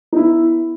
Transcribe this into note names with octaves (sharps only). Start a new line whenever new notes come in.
D#4
B3 E4